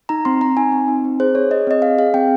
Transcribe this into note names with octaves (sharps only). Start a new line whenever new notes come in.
D#4 A#5
C4 C6
C4 A#5
D#4 G#5
C4
D#4
C4
G#4 C5
G#4 C#5
G#4 D#5
C4 D#5
G#4 F5
G#4 F5
C4 G5